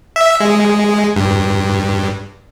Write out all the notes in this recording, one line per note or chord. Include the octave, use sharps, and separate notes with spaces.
E5
G#3
G2